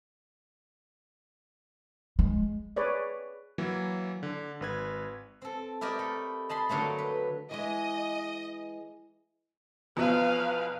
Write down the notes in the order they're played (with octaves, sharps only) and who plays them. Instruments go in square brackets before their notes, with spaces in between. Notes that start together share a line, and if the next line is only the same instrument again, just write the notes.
[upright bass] G#3
[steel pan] G#4 B4 C#5 D5
[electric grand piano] E3 F#3 A#3
D3
G#1 B4 G#6
[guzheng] C4 A4
E4 G4 A#4 D5 D#5
A3
D#5 A5 B5 C6
D3 F#3 A3 A#3
B4
[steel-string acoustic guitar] E3 G#3 [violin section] D#5
[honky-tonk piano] E2 B2 F3 [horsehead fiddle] B4 F5